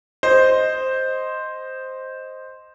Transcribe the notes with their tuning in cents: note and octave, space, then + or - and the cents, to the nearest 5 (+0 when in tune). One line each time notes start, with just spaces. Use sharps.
C5 +0 D#5 +0